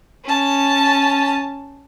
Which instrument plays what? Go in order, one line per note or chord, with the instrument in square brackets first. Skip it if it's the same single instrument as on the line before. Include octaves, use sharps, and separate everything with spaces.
[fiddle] C#4 A5